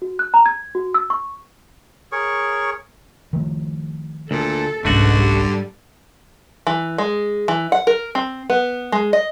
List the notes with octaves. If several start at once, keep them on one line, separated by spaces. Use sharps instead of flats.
F#4
F#6
A#5
G#6
F#4
E6
C#6
G#4 A#4 C#5 C#6
D#3 F3 A3
D2 A#2 A4
F1 C2 G#2 B2 D3 A3 C#4 F#4
G3
E3
G#3
E3
F#5
A#4
C4
B3
G#3
D#5